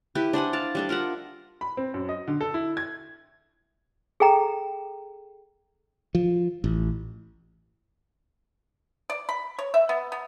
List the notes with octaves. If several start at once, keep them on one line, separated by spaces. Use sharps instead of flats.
E4 G4 B4
D4 C5 F#5 G#5
D5 F5 A5
G3 D4 A4
F4 A#4 E5 F#5
B5
C4
F#2
D#5
D3
A4
E4
G#6
G#4 A4 G5 A#5
F3
A1
D5
B5
C#5
E5
B3
B3